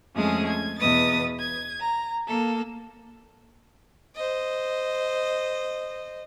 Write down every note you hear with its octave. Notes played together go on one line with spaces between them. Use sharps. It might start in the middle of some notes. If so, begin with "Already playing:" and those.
F2 G#3 A3 C#4 G#4 D#6
G#6
E2 B2 B4 D#5 D#6 A6
G#6
A#5
A#3 A4
C5 D#5